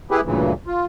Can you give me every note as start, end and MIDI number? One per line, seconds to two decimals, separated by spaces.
0.11 0.21 59
0.11 0.21 64
0.11 0.21 67
0.11 0.21 68
0.11 0.21 71
0.25 0.53 38
0.25 0.53 43
0.25 0.53 46
0.25 0.53 49
0.25 0.53 52
0.67 0.86 65